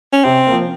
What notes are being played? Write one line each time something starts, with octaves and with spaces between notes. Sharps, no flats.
C#4
C3 C4
A#3
F3